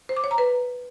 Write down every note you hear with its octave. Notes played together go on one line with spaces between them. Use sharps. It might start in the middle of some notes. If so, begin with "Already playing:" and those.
C5
D6
C#5
A#5
B4